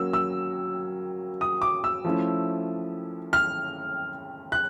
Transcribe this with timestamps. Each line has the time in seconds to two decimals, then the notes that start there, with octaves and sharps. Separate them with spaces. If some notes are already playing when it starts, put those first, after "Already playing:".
Already playing: F#3 A#3 C#4 E6
0.13 E6
1.41 D#6
1.62 D6
1.84 E6
2.05 F3 A3 C#4 E4
3.33 F6
4.52 F#6